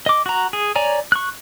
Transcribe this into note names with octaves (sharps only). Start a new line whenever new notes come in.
D#5 D6
F#4 A#5
G#4
C#5 D5 G#5 A#5
C#6 F#6